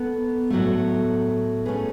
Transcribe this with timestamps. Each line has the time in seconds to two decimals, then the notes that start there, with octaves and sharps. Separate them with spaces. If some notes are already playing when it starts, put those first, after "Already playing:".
Already playing: B3 A4
0.50 A2 F#3 A3
1.65 A3 C#4 G#4 B4